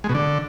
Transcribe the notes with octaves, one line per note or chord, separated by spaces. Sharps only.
G#3
B2
D3